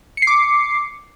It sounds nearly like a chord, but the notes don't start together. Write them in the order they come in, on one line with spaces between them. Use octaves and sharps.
C#7 C7 D6